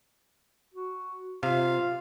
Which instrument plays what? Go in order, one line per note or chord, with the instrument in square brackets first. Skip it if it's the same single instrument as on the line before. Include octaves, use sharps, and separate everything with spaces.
[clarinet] F#4
[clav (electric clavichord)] C3 [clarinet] F4 [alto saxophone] F5